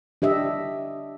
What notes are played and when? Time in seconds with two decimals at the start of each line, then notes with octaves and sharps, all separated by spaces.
0.22 D4 G4 D#5 E5